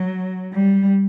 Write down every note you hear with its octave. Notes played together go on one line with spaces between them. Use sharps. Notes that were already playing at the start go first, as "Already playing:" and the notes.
Already playing: F#3
G3